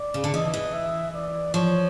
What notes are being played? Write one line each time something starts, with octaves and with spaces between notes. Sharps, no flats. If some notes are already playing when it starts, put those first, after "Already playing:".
Already playing: D5
C#3
D3
E3 D#5
E3
E5
D5
F3 C#5